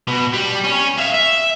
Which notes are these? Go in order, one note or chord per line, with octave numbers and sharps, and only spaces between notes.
B2
G3
C#4
E5 F5
E5